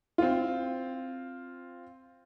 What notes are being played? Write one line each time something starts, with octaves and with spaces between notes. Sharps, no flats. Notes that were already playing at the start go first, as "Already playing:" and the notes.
C4 F4